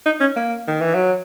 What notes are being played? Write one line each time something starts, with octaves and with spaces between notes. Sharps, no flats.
D#4
C#4
A#3
D#3
E3
F#3